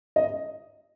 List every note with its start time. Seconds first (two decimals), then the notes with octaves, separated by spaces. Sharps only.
0.16 D#5